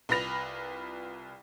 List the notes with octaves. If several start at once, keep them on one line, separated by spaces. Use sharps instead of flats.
C2 F4 B4 B5 A#6 F7